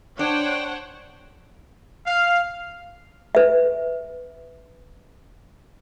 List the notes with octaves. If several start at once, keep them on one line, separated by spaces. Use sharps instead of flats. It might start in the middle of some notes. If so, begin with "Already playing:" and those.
D4 C5 C#5 F#5 G5
F5
B4 E5